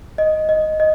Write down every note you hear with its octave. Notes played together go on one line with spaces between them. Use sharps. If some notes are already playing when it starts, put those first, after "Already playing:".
D#5
D#5
D#5